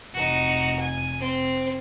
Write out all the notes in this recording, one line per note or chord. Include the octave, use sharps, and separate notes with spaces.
F1 F2 D#4 F#4
G#5
C4